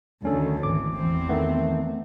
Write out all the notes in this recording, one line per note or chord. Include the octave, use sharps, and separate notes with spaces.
D2 D#3 C#4 A4
G#1 E3 D6
E2 E3 C4
D#3 A3 B3